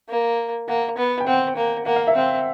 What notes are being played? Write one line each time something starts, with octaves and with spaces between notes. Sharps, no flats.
A#3
A#3 F#5
B3
G5
C4 F#5
A#3
A#3 F#5
F5
E5
C4 F5